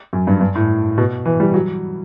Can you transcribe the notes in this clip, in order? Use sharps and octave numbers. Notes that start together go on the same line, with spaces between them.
F#2
G2
G2
A2
B2
E3
G3
F#3